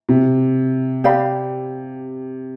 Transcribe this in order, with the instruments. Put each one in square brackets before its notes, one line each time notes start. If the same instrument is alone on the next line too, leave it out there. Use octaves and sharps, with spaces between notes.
[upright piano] C3
[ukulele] G4 D5 F5 B5